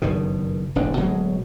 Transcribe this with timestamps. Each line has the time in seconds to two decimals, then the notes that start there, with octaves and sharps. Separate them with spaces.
0.02 F#1 G2 B2 D#3
0.75 E1 A1 G#2 D4
0.97 D1 B2 F#3 G#3